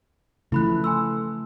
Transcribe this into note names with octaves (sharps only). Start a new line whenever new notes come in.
C#3 E3 F3 A3 E4 B5 F#6
G#5 C6 E6